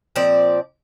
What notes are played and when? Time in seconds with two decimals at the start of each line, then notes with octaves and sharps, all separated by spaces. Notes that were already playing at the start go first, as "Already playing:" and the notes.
0.16 A#2 F3 C4 D5